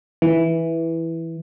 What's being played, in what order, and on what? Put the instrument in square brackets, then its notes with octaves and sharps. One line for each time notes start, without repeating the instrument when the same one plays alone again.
[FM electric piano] E3